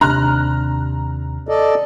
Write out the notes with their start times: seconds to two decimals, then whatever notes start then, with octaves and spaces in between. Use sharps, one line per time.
0.01 D#2 C3 D4 A#5 F6 F#6
1.49 A4 D5 D#5